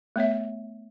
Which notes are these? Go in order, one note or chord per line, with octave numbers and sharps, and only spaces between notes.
A3 B3 C#5 E5